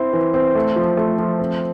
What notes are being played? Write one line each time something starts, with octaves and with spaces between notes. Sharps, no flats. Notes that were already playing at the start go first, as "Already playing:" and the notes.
Already playing: C4 E4
E3
C4
A3
F3
A3
F3
C4